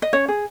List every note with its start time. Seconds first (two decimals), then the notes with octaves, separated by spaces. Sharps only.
0.02 D#5
0.13 C#4 C#5
0.28 G#4